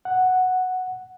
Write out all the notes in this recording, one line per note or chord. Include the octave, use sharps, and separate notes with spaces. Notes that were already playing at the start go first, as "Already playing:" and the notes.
F#5